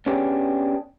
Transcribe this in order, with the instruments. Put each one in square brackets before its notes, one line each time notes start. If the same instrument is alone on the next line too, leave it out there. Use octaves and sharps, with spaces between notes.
[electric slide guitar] B3 C#4 D4 G4 G#4